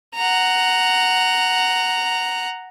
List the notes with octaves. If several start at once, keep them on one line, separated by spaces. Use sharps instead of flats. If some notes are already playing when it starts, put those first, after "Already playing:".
F#5 A#5